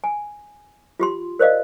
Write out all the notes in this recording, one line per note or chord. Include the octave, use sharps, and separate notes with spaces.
G#5
F4 G4 C6
A#4 C5 D5 D#5 F5